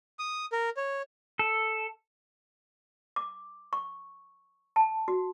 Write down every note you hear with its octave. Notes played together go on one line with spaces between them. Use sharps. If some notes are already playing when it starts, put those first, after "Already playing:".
D#6
A#4
C#5
A4
D6
C#6
A5
F#4